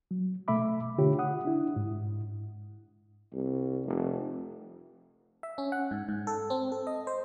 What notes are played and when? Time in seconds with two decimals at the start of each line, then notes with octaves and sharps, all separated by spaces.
0.11 F#3
0.48 B2 A3 A4 E5 B5 D6
0.98 D3 F4 G4 C#5
1.19 F#5 D#6
1.45 D4 E4
1.76 G#2
3.33 C2
3.85 F1
5.43 E5
5.58 C#4
5.72 F#5
5.91 G#2
6.09 G#2
6.27 A4
6.50 C4
6.72 A4
6.87 D#5
7.07 C5